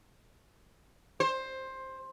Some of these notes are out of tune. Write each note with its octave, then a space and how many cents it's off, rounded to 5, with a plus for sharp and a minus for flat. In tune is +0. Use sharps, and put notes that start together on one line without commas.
C5 +15